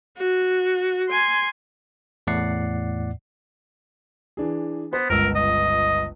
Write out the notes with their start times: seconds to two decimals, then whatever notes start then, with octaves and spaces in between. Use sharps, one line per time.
0.18 F#4
1.10 G#5 C6
2.27 E2 A2 D5 F#5 C7
4.37 E3 D4 G#4
4.93 B3 C5
5.10 G1 C#2 A#4 E6
5.35 D#5